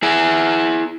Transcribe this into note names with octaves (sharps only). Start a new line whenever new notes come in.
E4 G#4